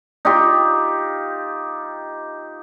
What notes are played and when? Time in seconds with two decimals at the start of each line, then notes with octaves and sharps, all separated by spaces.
0.25 D#4 F4 G4